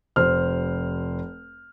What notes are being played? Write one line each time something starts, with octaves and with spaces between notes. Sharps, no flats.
F1 C5 F6